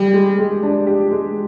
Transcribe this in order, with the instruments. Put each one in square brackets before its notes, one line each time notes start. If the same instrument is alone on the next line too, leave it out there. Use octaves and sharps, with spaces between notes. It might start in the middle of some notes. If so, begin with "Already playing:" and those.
Already playing: [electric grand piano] G3 [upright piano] G4
[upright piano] G#3
G#3
D4
G4
G#3